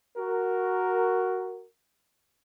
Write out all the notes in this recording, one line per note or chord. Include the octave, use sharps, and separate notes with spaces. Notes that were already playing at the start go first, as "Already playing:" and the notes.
F#4 A#4